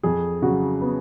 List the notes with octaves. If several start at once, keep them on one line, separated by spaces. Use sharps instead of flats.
F2 G#4
C#3 F#3 F#4
B3